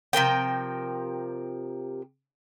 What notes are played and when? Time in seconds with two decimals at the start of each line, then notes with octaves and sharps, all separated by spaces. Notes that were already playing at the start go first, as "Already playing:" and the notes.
0.13 C3 F3 A#4 G5